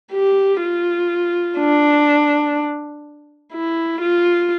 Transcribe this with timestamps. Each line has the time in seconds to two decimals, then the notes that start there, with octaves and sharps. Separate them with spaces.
0.13 G4
0.62 F4
1.58 D4
3.53 E4
4.01 F4